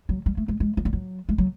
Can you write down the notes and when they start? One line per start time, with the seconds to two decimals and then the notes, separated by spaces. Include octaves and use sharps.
0.09 F#3
0.26 G3
0.37 A3
0.48 G#3
0.60 G#3
0.77 F#3
0.85 G3
0.93 F#3
1.29 G#3
1.38 F#3